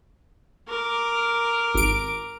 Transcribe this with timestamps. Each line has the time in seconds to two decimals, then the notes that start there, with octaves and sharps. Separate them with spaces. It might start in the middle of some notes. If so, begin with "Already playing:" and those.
0.68 A#4 D6
1.75 G#1 D7